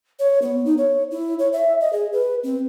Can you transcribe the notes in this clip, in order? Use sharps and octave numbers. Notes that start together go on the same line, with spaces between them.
C#5
B3
D#4
C#5
E4
C#5
E5
D#5
G#4
B4
C4